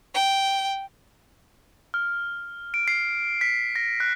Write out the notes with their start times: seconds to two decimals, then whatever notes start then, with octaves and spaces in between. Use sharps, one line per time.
0.15 G5
1.94 F6
2.74 D7
2.88 C7
3.41 B6
3.76 A#6
4.00 F#6